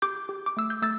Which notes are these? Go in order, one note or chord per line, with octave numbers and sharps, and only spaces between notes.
G4 D6 G6
G4
D6
A3 E6
G6
A3 E6 A6